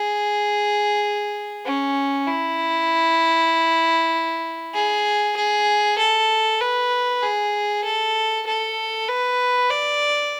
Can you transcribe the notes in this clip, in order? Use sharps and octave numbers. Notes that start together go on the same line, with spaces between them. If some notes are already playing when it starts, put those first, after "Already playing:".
Already playing: G#4
C#4
E4
G#4
G#4
A4
B4
G#4
A4
A4
B4
D5